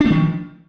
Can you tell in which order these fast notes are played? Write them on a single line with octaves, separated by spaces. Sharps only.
D4 A3 D#3 F3